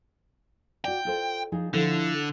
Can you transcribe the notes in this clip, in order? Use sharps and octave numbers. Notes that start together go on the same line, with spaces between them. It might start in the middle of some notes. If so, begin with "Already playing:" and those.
F#4 D5 G5
F4 A4 C5
F3 D#4 G#4
D3 F3 E4 A4